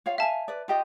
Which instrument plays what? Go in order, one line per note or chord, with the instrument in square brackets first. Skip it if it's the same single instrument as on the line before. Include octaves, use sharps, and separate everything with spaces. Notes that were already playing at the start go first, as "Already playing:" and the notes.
[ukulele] F4 C#5 F5
[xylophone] E5 A5 [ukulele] F5 G#5
[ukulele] B4 D5
F4 G4 D#5